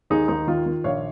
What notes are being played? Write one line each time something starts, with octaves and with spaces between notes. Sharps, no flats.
D#2 D#4 G#4
D#2 D#4
D#3 F4
D#3
A#1 C#5 F5